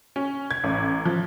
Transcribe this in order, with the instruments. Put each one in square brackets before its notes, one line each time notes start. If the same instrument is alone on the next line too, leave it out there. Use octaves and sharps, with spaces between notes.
[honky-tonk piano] C#4
G#6
A1
F3